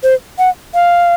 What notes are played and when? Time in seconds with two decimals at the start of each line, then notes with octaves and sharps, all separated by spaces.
0.03 C5
0.39 F#5
0.74 F5